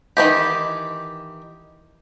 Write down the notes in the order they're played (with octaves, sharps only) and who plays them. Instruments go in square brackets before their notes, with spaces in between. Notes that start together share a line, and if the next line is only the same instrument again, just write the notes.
[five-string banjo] D#3 E3 G4